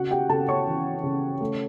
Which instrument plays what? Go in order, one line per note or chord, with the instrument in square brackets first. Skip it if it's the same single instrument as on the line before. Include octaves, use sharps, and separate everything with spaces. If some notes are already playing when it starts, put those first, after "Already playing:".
Already playing: [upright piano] C#3 F#4 F#5
G4 G5
C#3 A4 A5
C#5 C#6
E3
C#3
A3